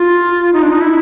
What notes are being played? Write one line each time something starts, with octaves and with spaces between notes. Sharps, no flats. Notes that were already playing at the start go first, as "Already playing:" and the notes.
Already playing: F4
D#4
D4
D#4
E4